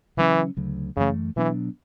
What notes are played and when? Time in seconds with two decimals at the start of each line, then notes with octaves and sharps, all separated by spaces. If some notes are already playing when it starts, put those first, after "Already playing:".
0.17 C#3 E3 F#3 C#4
0.57 D2 C#3 F#3
0.96 F#2 C#3 E3 A3
1.36 B2 E3 F#3 B3 D4